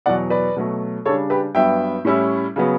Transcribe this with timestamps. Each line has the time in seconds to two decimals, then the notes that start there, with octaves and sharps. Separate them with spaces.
0.06 E2 B2 F#3 D5 F#5
0.30 B4 D5
0.56 B2 F#3 A3
1.06 C#3 G3 D4 A4 C#5
1.30 G4 B4
1.55 G2 F#3 B3 E5 G5
2.05 A2 G3 C#4 E4
2.56 C#3 F#3 B3